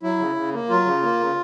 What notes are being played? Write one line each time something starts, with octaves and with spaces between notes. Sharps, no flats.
F#3 E4
C#3
C#3
A#3
F#3 F4
C#3
A#3
C#3